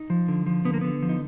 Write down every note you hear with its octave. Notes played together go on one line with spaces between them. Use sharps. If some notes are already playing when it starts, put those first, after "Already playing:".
Already playing: D#4
F3
D3
F3
D3 B3
A#3
D3 B3
F3
D#4